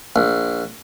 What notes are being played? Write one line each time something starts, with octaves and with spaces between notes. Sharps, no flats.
A#1